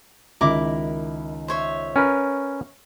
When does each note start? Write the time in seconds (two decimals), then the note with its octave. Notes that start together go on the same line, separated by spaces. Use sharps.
0.41 C#2 D#3 E4 A#4 D6
1.48 C5 C#5 E5
1.96 C#4 A#4 B4